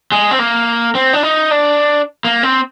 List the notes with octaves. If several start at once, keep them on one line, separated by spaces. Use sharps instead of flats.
G#3
C4
A#3
C4
D4
D#4
D4
A#3
C4